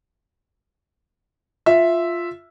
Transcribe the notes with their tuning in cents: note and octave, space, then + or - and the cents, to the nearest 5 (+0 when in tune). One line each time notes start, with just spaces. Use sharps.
F4 +0 E5 +0